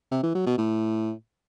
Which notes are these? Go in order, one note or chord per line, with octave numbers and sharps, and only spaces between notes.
C3
E3
F#3
B2
A2